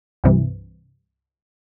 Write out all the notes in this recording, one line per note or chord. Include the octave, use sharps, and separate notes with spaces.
C2 G2 C3 E3